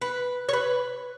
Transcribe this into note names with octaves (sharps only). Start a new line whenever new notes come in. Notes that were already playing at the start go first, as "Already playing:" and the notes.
B4
C#5
B4